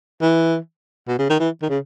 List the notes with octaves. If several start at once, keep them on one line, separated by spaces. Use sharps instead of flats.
E3
B2
C#3
D#3
E3
D#3
C#3